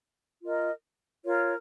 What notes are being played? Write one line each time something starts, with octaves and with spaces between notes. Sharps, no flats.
F4 A#4 D#5
F4 A#4 C#5